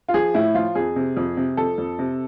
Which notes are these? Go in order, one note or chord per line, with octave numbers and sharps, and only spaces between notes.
F4
F3 G#4
A2 E4
F3 F4
F2 G#4
C3
F2
C3
F2 A4
F2
C3